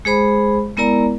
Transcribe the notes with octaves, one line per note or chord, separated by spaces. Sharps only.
G#3 G#4 C5 B5
G#3 B3 E4 A#4 D5 A#5